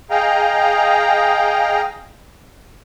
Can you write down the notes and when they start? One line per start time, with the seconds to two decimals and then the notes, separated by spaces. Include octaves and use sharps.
0.10 G#4 D#5 F5 G5 A#5